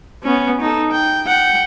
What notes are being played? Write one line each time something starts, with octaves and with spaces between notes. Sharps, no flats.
B3 C#4
D#4 A4
G5
F#5 G5